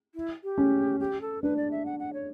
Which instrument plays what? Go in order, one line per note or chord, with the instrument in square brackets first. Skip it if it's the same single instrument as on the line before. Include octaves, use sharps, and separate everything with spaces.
[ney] E4
G4
[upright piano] C#4
[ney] G4
A4
[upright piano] D4 [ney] B4
[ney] D5
E5
F#5
F#5
C#5